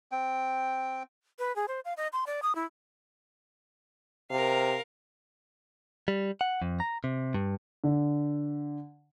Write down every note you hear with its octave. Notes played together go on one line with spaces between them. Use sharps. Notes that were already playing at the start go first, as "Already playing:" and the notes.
C4 G5
B4
G#4
C5
F5
D#5
C6
D5
D#6
E4
C3 A#4 F5
G3
F#5
F2
A#5
C3
G2
D3